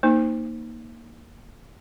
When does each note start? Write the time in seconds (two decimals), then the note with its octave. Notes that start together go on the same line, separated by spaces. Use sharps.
0.03 A#3 D#4 C5